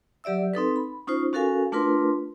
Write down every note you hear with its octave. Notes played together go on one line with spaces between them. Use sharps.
F#3 G4 D5 E5 E6
C4 D#4 A4 B4
B5
C#4 D#4 F4 C5
C#4 F#4 A4 A#4 F5 G#5
A3 D4 F4 A#4 B4 C6